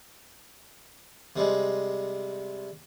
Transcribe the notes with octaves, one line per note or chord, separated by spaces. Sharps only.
C3 G3 G#3